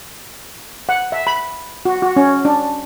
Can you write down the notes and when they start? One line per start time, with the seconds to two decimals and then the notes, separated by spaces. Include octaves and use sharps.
0.89 F#5
1.12 E5
1.27 B5
1.85 F#4
2.02 F#4
2.16 C#4
2.45 D4